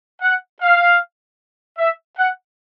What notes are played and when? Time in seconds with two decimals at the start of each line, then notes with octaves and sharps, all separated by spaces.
0.21 F#5
0.61 F5
1.78 E5
2.16 F#5